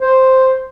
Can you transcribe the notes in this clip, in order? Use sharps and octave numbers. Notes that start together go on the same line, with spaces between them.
C5